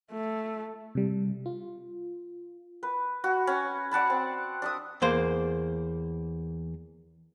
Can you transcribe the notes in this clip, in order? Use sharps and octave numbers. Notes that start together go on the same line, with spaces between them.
A3
C3 G3
F4
B4
F#4
C#4
D5 F#5 A5 B5
C4
D4 E5 D#6
E2 A#3 C5